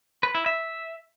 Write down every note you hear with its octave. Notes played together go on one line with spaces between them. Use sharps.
B4
E4
E5